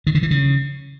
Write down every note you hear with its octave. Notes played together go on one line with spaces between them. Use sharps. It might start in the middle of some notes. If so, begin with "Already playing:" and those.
D#3
D3
E3
C#3